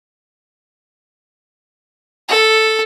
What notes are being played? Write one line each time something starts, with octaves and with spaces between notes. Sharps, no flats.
A4